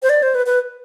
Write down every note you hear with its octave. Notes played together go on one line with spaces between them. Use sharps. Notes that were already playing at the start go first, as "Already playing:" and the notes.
C5
D5
C5
B4
B4